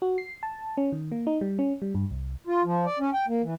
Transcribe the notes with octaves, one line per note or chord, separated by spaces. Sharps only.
F#4
C7
A5
C#4
D#3
A#3
D#4
G3
C#4
G3
G2
C2
F4
F3
D5
C#4
G5
A#3
E3